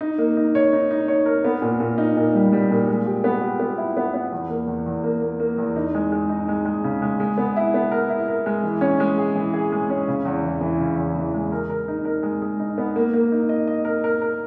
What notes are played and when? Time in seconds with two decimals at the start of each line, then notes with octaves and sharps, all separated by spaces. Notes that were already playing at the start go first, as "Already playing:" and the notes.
0.01 D#4
0.18 A#3
0.37 D#4
0.55 C#5
0.73 D#4
0.91 D#4
1.08 C#5
1.26 A#4
1.45 B3
1.62 A#2
1.80 A#2
1.98 D#4
2.17 A#2
2.35 G3
2.53 G3
2.71 A#2
2.88 G#3
3.06 G4
3.24 B3
3.42 G4
3.60 B3
3.78 E4
3.97 B3
4.14 B3
4.32 E2
4.50 A#3
4.67 E2
4.86 E2
5.04 A#3
5.21 A#3
5.40 A#3
5.58 E2
5.76 D#4
5.95 G#3
6.12 G#3
6.29 D#4
6.49 G#3
6.65 G#3
6.84 C#3
7.02 G#3
7.20 G#3
7.38 B3
7.56 E4
7.74 B3
7.91 A#4
8.10 E4
8.28 A#4
8.46 G#3
8.63 E3
8.81 C#4
9.00 G#3
9.18 G#4
9.36 E3
9.54 G#4
9.72 G#3
9.90 C#4
10.08 C#3
10.25 E2
10.44 E3
10.61 E3
10.80 C#3
10.97 E2
11.16 E3
11.34 G#3
11.52 A#4
11.70 A#4
11.88 D#4
12.05 A#4
12.23 G#3
12.42 G#3
12.60 D#4
12.78 B3
12.96 A#3
13.13 A#3
13.32 D#4
13.49 D#5
13.67 D#5
13.85 A#4
14.04 A#4
14.22 A#4